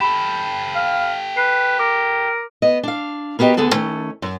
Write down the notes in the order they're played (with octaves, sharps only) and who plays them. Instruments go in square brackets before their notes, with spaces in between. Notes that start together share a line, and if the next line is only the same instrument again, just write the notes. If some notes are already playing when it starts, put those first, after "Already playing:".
[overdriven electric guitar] G4 A4 [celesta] B5 E7
[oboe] F5
[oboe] B4 [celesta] C7
[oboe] A#4 [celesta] D6
[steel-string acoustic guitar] B3 D#5
D4 F5
A#3 B3 F#4 G4 D#5
D2 D3 B3 G#4 A4
D#3 A3 C#4
F#2